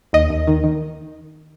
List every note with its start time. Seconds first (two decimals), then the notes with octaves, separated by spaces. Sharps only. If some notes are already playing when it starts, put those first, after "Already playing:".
0.13 D#2 D#5
0.30 D#2
0.47 D#3
0.64 D#3